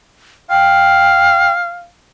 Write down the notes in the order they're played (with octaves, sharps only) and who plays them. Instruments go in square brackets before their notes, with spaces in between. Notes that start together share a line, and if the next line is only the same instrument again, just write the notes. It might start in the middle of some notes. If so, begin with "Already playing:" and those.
[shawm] F5 [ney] G5